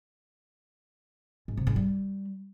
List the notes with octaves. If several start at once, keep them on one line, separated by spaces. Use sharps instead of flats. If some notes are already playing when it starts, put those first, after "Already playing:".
G#2
C3
G#2
G3